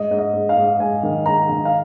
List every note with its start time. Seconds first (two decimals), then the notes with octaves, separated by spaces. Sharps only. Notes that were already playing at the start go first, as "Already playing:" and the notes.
Already playing: G#2 D#5
0.11 G#2
0.19 D#5
0.34 G#2
0.49 F5
0.57 G#2
0.80 G#2 G#5
1.03 D#3
1.26 G#2 A#5
1.49 D#3
1.65 F5